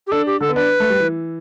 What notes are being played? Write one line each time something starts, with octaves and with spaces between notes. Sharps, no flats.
G4
D4 A4
G4
D3 A4
B3
D4 B4
A3
G3
E3